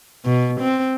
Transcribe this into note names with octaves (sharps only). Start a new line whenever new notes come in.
B2
C4